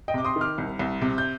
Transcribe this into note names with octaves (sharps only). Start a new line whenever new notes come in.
D#5 G5
C3 D6
C6 D#6
D#3
D6 F6
C2
C2
C3
G6